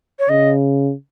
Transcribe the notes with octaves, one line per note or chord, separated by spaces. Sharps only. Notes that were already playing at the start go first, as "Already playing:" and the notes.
C#5
C#3 D#5